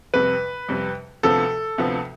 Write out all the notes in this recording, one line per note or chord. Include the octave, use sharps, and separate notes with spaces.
F2 C3 G3 B4
F2 C3 G3
D2 C3 F3 B3 A4
D2 C3 F3 B3